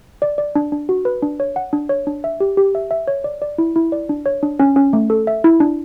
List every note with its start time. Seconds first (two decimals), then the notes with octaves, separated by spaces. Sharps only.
0.22 D5
0.38 D5
0.56 D4
0.72 D4
0.89 F#4
1.05 B4
1.22 D4
1.40 C#5
1.56 F#5
1.73 D4
1.89 C#5
2.07 D4
2.24 E5
2.40 G4
2.57 G4
2.75 E5
2.91 E5
3.08 C#5
3.24 D5
3.42 D5
3.58 E4
3.76 E4
3.92 D5
4.09 D4
4.26 C#5
4.43 D4
4.60 C#4
4.76 C#4
4.93 A3
5.10 A4
5.27 E5
5.44 E4
5.60 D4